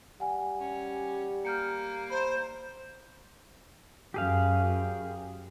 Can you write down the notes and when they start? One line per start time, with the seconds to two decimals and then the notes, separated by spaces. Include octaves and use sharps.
0.20 G3 F#5 G#5
0.60 C#4
1.45 A#3 F6 G6 C#7
2.10 C5 B5
4.14 F#2 G4 G#4 F5